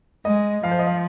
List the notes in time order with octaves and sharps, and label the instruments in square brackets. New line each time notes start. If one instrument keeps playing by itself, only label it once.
[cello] G#3 [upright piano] D#5
[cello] F3 [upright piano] F5
[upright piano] C5
D#5
F5